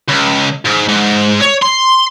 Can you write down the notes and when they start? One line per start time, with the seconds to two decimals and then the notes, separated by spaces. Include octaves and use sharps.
0.08 C#2
0.65 G#2
0.89 G#2
1.42 C#5
1.62 C6